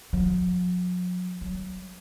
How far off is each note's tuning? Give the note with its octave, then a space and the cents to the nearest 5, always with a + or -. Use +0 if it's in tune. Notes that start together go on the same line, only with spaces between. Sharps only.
F#3 -45
F#3 +10